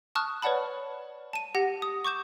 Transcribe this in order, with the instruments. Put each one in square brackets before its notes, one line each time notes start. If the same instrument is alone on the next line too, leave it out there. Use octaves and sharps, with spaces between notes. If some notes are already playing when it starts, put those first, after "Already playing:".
[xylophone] A5 C#6 D#6 F6 F#6
B4 C#5 D5 F#5 A5 B5
A5 D#7
G4 F#5 A#6
D#6
C#6 D6 G6 E7